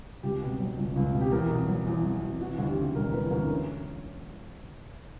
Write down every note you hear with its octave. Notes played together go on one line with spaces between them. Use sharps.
C#2 G4
B2
F#3
C#2
C#2
B2
G4
E2 A#4
B2
F#3
E2
E2
B2
E3 F#4
D2
G4
C#3
E1 A#4
E3 B4
D2 A#4
C#4